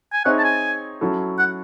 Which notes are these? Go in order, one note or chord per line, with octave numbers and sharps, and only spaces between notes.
G#5
C4 D#4 G#4 C#5 E5 F#5
A5
G#5
F#3 C#4 E4 A4
F#5